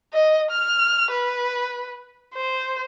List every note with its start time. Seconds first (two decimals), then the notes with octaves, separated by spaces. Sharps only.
0.13 D#5
0.51 F6
1.11 B4
2.35 C5